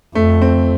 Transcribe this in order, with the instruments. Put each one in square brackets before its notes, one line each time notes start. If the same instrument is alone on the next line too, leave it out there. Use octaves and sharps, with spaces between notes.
[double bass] F2 [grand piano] A3
[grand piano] C4